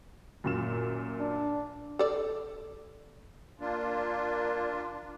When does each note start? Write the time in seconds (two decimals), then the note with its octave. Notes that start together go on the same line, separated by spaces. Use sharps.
0.44 F#2 A#2 E7
1.20 D4
1.99 A4 D5
3.60 A#3 D4 F4